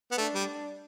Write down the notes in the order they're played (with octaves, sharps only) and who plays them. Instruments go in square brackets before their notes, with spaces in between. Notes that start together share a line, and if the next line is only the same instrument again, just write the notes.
[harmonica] B3
[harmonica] A3 [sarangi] D4
[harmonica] G3